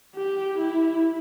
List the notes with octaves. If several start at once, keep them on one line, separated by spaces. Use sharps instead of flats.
G4
E4